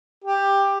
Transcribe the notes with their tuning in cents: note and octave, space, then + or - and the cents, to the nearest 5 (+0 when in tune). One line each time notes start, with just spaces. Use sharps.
G4 +10